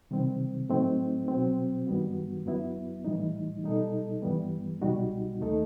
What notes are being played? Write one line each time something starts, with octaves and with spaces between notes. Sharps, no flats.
C3 D#3 G3 C4
A2 F#3 A3 C4 D#4
B2 F#3 C4
G2 D#3 G3 B3 F#4
F#2 F#3 B3 E4
A2 E3 G3 D#4
B2 G3 D#4 A4
G2 E3 G3 B3
C2 B2 G3 D#4 F#4
D#2 D#3 A3 D#4 A4